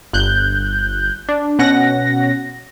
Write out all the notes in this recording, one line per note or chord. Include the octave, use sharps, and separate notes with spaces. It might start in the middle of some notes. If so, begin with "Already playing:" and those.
G1 F#6 G6
D4
B2 C#4 F#5 A#6